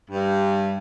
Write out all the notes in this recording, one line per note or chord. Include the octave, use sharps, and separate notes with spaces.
G2